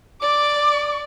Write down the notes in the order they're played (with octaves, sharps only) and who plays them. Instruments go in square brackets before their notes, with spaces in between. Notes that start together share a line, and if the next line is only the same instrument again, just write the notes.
[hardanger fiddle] D5 [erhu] D6